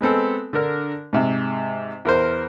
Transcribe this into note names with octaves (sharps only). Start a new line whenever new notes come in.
G#3 B3 C4 A4
D3 D4 A#4
G#2 C3
E2 A#4 C5